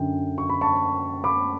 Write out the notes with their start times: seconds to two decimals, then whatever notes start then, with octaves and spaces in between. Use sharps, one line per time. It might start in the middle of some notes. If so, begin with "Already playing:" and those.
Already playing: F#2 D3 G5
0.38 C#6
0.49 B5
0.61 A5 C#6
1.24 B5 D6